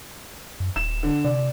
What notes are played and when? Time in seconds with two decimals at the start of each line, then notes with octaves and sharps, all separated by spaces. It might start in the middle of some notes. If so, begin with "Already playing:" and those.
0.60 F#2
0.76 D#1 E7
1.03 D3
1.24 C3 D5